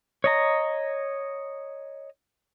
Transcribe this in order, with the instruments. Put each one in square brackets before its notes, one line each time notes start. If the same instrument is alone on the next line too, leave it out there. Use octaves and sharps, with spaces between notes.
[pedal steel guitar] C#5 D#5 A#5